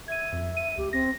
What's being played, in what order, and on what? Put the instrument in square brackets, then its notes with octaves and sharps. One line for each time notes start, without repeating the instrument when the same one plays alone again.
[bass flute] E5 [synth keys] G#6 D#7
[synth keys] F2
D#7
[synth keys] C#2 [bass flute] G4
[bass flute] C4 [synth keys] A#6